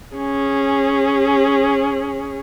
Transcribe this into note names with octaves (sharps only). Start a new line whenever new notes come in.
C#4 G#4